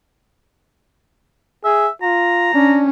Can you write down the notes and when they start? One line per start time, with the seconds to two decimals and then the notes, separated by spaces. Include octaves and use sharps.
1.65 G#4 E5
2.02 F4 A#5
2.54 C#4 D4